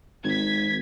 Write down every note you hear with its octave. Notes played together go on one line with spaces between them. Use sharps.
G#1 G#6 B6